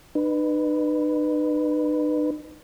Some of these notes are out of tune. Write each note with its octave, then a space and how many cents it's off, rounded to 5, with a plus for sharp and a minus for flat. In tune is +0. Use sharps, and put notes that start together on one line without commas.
D#4 -45 B4 +0